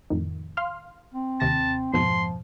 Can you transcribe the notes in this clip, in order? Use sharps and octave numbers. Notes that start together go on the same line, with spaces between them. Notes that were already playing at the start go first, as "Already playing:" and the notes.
F2 A2 D#3
F5 C6 F6
C4
D#2 C3 A5 A#6
F2 G#2 B2 F3 C6